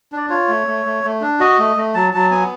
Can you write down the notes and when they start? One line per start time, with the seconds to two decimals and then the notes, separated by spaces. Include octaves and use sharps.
0.12 D4 D5
0.30 F4 C#5
0.48 A3
0.67 A3
0.86 A3
1.04 A3
1.21 D4
1.40 F#4 D#5
1.59 A3
1.76 A3
1.94 F#3 A5
2.14 F#3 A5
2.31 B3 G#5